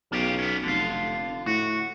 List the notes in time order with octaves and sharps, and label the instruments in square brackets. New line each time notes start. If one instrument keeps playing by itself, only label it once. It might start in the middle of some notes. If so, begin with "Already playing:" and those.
[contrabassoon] B1 [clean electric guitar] C#4 F4 G4
[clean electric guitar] B3 C#4
[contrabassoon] F1 [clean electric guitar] D3 F4
[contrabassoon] A2 [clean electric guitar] F#4